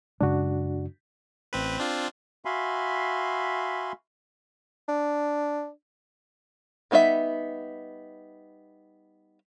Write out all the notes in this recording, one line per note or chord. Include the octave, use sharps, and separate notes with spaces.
F#2 C#3 G#3 D4 F#4
A1 C4 B4
C4 D4 F4
F#4 E5 F5 G#5 B5 C6
D4
G3 B3 D#4 F#4 E5